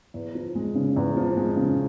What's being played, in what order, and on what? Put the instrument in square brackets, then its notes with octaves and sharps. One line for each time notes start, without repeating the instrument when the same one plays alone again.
[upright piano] E2
F3
G#3
C#3
E2
F3
G#3
C#3